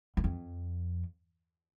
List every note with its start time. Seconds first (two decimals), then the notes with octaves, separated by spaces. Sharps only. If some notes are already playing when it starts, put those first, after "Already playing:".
0.17 F#2
0.24 F2